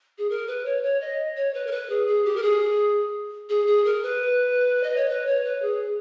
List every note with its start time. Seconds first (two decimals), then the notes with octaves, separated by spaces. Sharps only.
0.18 G#4
0.30 A#4
0.47 B4
0.65 C#5
0.83 C#5
1.01 D#5
1.36 C#5
1.54 B4
1.66 A#4
1.71 B4
1.89 G#4
2.07 G#4
2.25 G4
2.36 A#4
2.42 G#4
3.49 G#4
3.67 G#4
3.85 A#4
4.03 B4
4.83 D#5
4.96 C#5
5.09 B4
5.27 C#5
5.44 B4
5.62 G#4